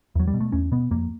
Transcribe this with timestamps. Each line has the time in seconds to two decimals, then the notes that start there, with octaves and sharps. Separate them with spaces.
0.15 E2 F#3
0.27 G3
0.34 B2
0.41 A3
0.52 E2 C#4
0.72 B2 B3
0.91 F2 A#3